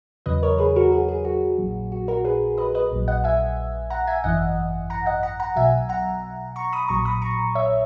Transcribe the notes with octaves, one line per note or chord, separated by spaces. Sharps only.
E2 C#3 F#3 B4 D#5
A#4 C#5
G#4 B4
F#4 A#4
G#4
G#4
F#4
A#1 A#2 F#3
F#4
F#4 A#4
G#4 B4
B4 D#5
B4 D#5
A#1 A#2 F#3
D#5 F#5
E5 G#5
F#5 A#5
E5 G#5
G#1 F#2 E3 D#5 F#5
F#5 A#5
D#5 F#5
F#5 A#5
F#5 A#5
B1 B2 F#3 E5 G#5
F#5 A#5
A#5 C#6
B5 D#6
A#1 A#2 F#3 A#5 C#6
B5 D#6
A#5 C#6
C#5 E5